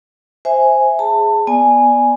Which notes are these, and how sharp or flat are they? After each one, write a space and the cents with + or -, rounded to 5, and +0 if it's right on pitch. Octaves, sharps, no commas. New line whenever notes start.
C5 +0 E5 +0 G#5 +0
G#4 +0 A5 +25
B3 -5 D5 +0 G#5 +0